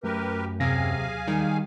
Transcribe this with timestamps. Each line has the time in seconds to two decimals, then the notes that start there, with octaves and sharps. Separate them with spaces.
0.04 F#2 A3 G4 A#4 B4
0.60 D#2 C3 F#3 G#4 F5 G#5 A#6
1.28 D#3 G3